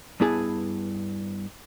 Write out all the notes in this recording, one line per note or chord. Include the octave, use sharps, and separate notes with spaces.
G2 B3 E4 G#4 A5